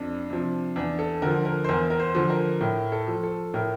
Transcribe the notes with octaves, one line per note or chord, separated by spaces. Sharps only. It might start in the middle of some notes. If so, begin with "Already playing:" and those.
Already playing: F2 D4
C3 F3
E2 D4
A4
D3 F3 A#4
A#4
C5
E2 A#4
A#4
C5
D3 F3
A#4
A2 A#4
A4
F3
A4
A2 A#4